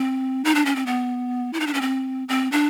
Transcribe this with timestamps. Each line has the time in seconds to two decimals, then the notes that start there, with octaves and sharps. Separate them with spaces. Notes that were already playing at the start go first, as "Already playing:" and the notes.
Already playing: C4
0.45 D#4
0.55 D4
0.66 C#4
0.76 C4
0.86 B3
1.53 E4
1.60 D#4
1.67 D4
1.74 C#4
1.81 C4
2.29 C4
2.52 D4